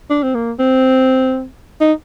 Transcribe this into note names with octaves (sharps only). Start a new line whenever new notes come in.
D4
C4
A#3
C4
D#4